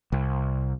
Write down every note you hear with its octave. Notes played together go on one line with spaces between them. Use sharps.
C2